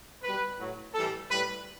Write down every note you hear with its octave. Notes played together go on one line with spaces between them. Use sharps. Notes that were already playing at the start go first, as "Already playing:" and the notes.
B2 G3 B4
A2 F#3
A2 E3 G3 A4
A2 G3 B4